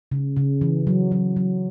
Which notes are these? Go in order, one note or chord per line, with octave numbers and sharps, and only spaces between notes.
C#3
C#3
E3
F#3
F#3
F#3